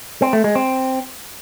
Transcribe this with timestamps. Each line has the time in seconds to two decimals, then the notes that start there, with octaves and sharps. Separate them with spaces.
0.22 C4
0.33 A3
0.44 G#3
0.55 C4